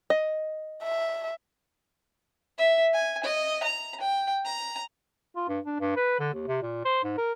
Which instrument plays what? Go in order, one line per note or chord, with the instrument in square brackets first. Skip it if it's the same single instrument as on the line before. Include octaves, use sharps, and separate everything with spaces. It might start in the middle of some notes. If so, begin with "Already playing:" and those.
[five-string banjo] D#5
[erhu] E5
[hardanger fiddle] E5
G#5
D#5
A#5
G5
A#5
[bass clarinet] F4
G2
D4
G2
B4
D3
D#2
C3
A#2
C5
G#2
A#4